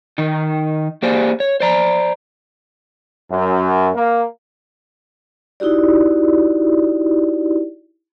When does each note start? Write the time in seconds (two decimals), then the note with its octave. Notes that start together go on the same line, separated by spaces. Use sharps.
0.18 D#3 D#4
1.02 A#3 G4 G#4 C5 D5
1.40 C#5
1.60 C5 D5 A#5
3.30 F#2
3.95 A#3
5.60 D#4 E4 F#4 G4 D5